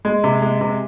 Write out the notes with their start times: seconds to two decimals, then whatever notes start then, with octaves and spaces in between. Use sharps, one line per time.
0.05 G#3
0.24 C3
0.42 G#3
0.61 C3